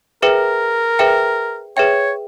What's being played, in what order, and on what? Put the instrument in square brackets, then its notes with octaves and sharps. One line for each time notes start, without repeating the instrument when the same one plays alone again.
[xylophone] G#4 B4 E5 G5 [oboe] A#4
[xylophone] G#4 B4 E5 G5
[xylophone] G#4 B4 E5 G5 [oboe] C#5